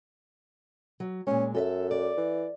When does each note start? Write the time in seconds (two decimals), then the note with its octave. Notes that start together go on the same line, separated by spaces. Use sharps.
1.00 F#3
1.27 A#2 G#3 C#4
1.55 F#2 A4 D#5 E5
1.91 D5
2.17 E3